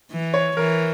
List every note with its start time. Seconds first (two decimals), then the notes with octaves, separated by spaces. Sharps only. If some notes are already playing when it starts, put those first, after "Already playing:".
0.11 E3
0.34 C#5
0.57 E3 A#4